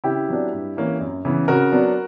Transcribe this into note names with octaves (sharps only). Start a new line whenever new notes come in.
C#3 E4 G4
F#3 B3 D4
G2
E3 A#3 C#4
F#2
C#3 E3 B3
C#3 F#4 A#4
F#3 B3 D4